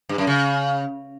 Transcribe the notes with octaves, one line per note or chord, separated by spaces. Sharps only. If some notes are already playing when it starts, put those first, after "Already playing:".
G2
F#2
C#3